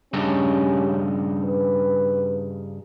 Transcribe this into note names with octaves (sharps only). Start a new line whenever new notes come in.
G2 C#3 C#4 D#4 G4
B4